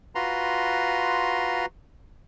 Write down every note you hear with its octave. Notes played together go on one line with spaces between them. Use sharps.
F4 F#4 B4 A#5 C6